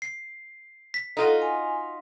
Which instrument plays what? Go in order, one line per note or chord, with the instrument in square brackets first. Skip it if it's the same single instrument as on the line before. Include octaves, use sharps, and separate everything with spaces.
[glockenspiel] C7
B6
[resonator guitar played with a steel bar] D#4 F4 F#4 [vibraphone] A4
[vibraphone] G#5